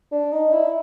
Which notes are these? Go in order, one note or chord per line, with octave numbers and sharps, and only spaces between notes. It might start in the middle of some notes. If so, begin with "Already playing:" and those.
D4
D#4
E4